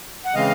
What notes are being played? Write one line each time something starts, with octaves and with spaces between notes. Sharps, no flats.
F#5
C#3 E3 G#3 C4 D#5 F5